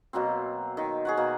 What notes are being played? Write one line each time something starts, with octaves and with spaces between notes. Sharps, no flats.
B2 F#3 A#3 C4
D#3
G#4 C#5 F#5
B2 A#3